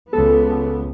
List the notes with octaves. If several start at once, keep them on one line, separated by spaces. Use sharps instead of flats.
C#2 B3 A4